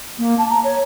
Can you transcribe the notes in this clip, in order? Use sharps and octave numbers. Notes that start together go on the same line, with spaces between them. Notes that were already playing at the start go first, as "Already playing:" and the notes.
A#3
A5
A#5
C#5